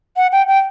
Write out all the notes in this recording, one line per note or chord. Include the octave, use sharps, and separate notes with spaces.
F#5
G5
G5